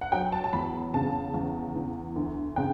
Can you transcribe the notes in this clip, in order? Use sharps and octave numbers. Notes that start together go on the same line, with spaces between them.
F#5
F#3 G5
A5
A5
E2 B5
C#3 A5
E2
E3
D2
C#3 G5